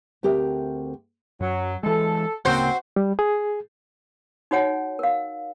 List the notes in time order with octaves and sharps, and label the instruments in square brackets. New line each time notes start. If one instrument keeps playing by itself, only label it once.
[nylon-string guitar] D2 C4 G4 A#4 E5
[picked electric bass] F#2 [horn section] F#3
[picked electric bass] E3 G#3 [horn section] A4
[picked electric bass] D1 C#3 A#3 [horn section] C4 [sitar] F#4 C5
[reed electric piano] G3
G#4
[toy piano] D#4 F#4 C#5 F#5 G#5
A#4 F5